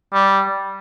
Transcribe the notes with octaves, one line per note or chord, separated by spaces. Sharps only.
G3